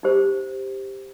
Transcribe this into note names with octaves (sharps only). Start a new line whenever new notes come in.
D#4 G4 C5